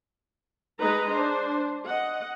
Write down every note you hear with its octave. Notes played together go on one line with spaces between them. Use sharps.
G#3 D#4 B4 D#5 A#5
D4 C5
D#5 F#5